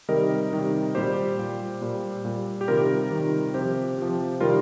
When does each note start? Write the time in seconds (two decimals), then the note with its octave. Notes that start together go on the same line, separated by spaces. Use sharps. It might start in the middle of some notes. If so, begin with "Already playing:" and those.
0.09 C3 D#3 G3 A#4 D#5
0.52 C3 D#3 G3
0.95 A#2 G3 G4 C5
1.38 A#2 G3
1.82 A#2 G3
2.25 A#2 G3
2.61 G4
2.68 C3 D#3 G3 F4 A#4
3.11 C3 D#3 G3
3.54 C3 F3 G4 C5
3.98 C3 F3
4.40 C3 D#3 G3 F4 A#4